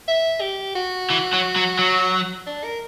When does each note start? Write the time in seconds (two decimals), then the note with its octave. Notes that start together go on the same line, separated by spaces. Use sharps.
0.08 E5
0.41 G4
0.75 F#4
1.10 E3
1.33 F#3
1.56 F#3
1.79 F#3
2.47 D4
2.64 A#4